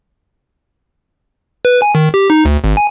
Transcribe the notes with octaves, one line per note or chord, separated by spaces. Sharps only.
B4
G#5
D#3
G4
D#4
D2
G#1
G#5